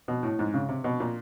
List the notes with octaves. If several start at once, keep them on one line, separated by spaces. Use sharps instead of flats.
B2
A2
G#2
C#3
C3
B2
A#2